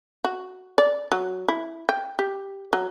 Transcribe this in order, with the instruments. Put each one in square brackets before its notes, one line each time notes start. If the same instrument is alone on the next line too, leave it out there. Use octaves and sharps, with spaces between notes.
[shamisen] F#4
D5
F#3
E4
G5
G4
F#3